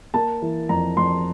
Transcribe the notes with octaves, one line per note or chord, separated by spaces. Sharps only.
A#3 A5
E3
F2 A#5
F2 C6